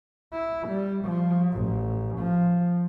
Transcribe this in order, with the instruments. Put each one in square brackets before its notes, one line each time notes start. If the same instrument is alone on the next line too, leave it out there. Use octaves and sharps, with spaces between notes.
[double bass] E4
G3
F3
A1
F3